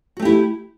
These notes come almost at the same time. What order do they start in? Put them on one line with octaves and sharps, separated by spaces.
F#4 A3 G4 E4